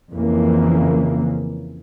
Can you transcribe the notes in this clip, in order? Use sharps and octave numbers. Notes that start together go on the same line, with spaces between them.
F2 C#3 E3 A#3